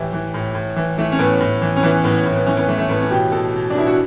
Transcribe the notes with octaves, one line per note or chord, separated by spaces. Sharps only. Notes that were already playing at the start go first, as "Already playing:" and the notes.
Already playing: A2 E3 G4
E3
A2
A2
E3
E3 A3
C#4
A2 B3
A2
E3
C#4
E3 B3
A2 B3
A2
B3
E3 C#4
B3
E3 A3
A3
A2 B3
C#4
B2 G4
B2 A4
B2
D4
B2 E4
F#4